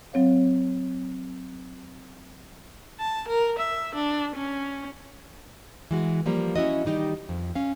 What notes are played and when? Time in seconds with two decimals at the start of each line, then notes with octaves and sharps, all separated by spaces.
0.13 F#3 C4 C#5 F5
3.00 A5
3.28 A#4
3.59 E5
3.95 D4
4.36 C#4
5.91 E3 G#3 F#4
6.26 F3 G3 A#3
6.56 C#4 E4 F#4 D#5
6.85 D#3 G3 D#4 G4
7.29 F2
7.55 C#4 F5